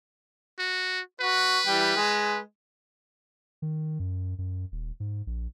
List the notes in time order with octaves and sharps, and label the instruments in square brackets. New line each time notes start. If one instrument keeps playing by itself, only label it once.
[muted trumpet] F#4
[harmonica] F#4 [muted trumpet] B4
[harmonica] E3 G3 G5
G#3
[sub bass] D#3
F#2
F#2
D#1
G#2
A#1